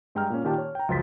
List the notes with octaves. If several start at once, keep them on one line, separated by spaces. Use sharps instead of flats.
G2 G#3 G5 A#5 F6
A#2 A#3 C#4
A#2 D#3 G4 G5 A5
C#5
G5 A#5
C#2 F#2 F3 C6 A6 B6